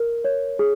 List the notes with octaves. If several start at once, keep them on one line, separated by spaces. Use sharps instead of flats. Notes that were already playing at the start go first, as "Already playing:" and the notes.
Already playing: A#4
C#5
G#4